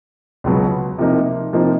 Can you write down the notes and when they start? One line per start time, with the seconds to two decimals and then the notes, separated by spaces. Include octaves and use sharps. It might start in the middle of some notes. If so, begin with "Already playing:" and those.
0.44 C#2 B2 F#3 B3
0.98 C3 F3 A#3 D#4
1.53 C3 F3 A#3 D#4